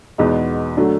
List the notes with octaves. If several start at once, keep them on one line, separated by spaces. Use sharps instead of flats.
E2 B2 G#3 B3 D#4
D3 F#3 A3 D4